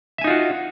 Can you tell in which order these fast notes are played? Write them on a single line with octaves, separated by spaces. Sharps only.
E5 G#5 D#4 F4 F#4